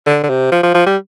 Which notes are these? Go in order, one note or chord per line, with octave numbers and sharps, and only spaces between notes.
D3
D3
C3
F3
F3
F3
G3